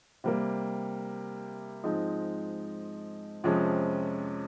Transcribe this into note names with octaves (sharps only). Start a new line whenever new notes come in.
C3 G3 A#3
G#2 F3 G#3 C4 D#4
F2 C3 F3 G#3 C#4